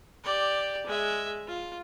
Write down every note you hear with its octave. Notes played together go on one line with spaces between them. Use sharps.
G4 D5
G#3 E5
F4